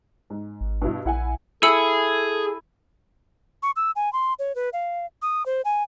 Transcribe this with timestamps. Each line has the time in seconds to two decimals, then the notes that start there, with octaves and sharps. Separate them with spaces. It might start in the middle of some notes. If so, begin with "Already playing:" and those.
0.30 G#2
0.61 G#1
0.82 G2 B2 E4
1.05 A#1 E4 F#5 G#5
1.63 E4 G#4 A4 E6 C#7 F#7
3.63 C#6
3.76 E6
3.96 G#5
4.13 C6
4.39 C#5
4.55 B4
4.73 F5
5.22 D#6
5.46 C5
5.65 G#5